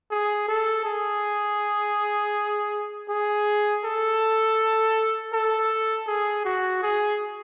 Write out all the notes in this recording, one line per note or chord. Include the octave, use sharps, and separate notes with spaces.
G#4
A4
G#4
G#4
A4
A4
G#4
F#4
G#4